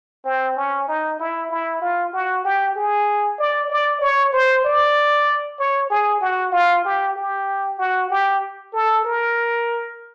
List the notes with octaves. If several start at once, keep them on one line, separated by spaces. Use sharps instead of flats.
C4
C#4
D#4
E4
E4
F4
F#4
G4
G#4
D5
D5
C#5
C5
D5
C#5
G#4
F#4
F4
G4
G4
F#4
G4
A4
A#4